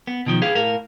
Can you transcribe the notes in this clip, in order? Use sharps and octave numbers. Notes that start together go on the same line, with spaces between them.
B3
B2 D#3 F3
G#4 B4 F5
A2 A#4 F5